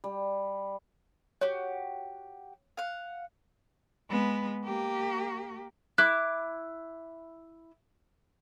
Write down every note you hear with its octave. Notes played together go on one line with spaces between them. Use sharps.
G3
F#4 G4 C#5
F5 F#5
G#3 B3
A#3 G4
E4 D6 F#6